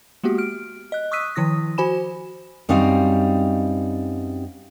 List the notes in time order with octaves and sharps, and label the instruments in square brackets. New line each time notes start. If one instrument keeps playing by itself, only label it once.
[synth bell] G#3 A#3 B3 F#4 G4
F6 D7
D#5 F#6
C#6 D#6 E6 F#6 B6 D#7
D#3 F3 E4 D#6 A#6
F#4 C5 G#5 B5 E7
[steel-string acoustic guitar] F#2 G3 C4 D#4 F5